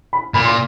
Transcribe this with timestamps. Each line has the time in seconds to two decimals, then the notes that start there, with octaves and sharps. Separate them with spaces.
0.13 B5
0.34 A#2 B5
0.45 C6